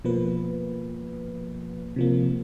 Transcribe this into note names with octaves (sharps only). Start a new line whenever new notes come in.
B2 F3 A#3 B4
C3 F3 A#3